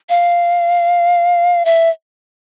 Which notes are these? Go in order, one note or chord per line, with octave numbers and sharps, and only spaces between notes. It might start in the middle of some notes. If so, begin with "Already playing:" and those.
F5
E5